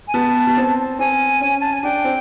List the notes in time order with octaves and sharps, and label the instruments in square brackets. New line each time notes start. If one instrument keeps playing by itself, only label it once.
[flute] G#5
[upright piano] B3 [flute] A5
[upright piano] B3
C4
[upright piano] C4 [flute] G#5
[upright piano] C#4
[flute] A5
G#5
[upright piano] D4 [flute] G5
[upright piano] C4